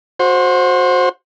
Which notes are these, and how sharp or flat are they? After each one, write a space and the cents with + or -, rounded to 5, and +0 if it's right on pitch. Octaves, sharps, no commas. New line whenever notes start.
F#4 -25 C5 +10